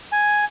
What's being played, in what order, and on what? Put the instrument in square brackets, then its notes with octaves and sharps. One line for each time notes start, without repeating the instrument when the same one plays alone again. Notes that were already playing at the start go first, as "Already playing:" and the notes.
[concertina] G#5